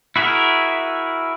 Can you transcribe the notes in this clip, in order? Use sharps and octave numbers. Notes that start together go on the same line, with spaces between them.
E4 F#4 G#4 A#4 E5